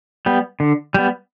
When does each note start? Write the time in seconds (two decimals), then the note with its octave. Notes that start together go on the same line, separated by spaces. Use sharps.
0.26 G3 B3
0.60 D3
0.94 G3 B3